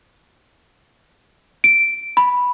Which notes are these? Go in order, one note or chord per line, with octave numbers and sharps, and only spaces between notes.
D7
B5